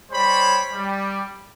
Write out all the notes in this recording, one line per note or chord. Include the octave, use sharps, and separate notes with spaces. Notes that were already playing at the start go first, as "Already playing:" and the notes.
G3 C5 C#5 B5
G3